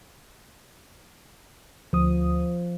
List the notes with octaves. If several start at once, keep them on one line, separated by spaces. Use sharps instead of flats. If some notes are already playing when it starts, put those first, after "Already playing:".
D2 F3 D#6